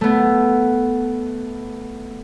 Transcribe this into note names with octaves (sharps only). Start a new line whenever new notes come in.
A3 B3